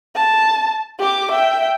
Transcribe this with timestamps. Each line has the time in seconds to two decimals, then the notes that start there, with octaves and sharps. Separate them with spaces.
0.15 A5
0.99 G4 D6
1.31 E5 G5